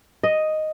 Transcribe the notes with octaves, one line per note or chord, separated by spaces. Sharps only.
D#5